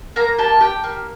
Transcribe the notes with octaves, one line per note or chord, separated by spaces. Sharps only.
A#3 A#5
G4 A5
G4 G5
A#3